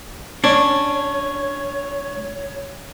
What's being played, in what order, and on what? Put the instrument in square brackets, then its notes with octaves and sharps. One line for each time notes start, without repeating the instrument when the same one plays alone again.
[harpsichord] C#4 [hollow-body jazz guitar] D4 [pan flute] C#5